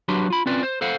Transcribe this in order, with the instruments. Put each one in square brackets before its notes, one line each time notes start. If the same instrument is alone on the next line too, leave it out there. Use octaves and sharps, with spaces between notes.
[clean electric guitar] F#3 D4 F#4 G4 B4 C6
F4 B5
C4 C#4 F4 B4 D5
C5
A4 C5 F5 F#5